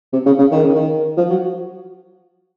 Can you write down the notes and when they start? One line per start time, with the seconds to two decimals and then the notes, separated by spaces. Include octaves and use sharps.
0.13 C3
0.26 C#3
0.39 C#3
0.52 D#3
0.64 C#3
0.75 D#3
1.17 F3
1.29 F#3